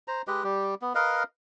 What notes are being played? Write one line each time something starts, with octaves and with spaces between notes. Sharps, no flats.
C5 A#5
G#3 G4 B4 D#5
G3 G4
B3
A#4 B4 D#5 F5